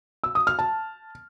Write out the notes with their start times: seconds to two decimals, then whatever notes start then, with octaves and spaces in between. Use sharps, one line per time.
0.24 E6
0.35 D#6
0.47 F6
0.59 A5